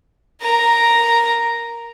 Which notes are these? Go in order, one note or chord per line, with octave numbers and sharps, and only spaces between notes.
A#4 A#5